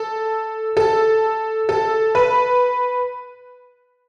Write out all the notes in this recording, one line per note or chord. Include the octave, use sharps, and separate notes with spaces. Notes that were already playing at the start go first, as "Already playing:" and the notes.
Already playing: A4
A4
A4
B4